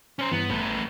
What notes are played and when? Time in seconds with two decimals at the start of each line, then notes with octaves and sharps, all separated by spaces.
0.19 C#4 C5 G#5 A#5
0.32 G2 E3 B3
0.51 A1 A3 B3